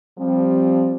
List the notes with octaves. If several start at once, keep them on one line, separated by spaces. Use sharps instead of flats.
F3 G3 C4